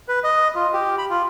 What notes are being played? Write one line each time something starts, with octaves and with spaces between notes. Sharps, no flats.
B4
D#5
F4
G4
B5
F4